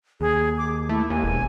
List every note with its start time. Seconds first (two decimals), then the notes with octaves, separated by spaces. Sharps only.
0.21 D#2 G#4
0.58 D6
0.89 A3 E4
1.10 D#2 G#5
1.24 E1